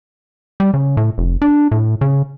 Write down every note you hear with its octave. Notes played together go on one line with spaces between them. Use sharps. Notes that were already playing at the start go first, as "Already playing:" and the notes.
G3
C#3
A2
F1
D4
A2
C#3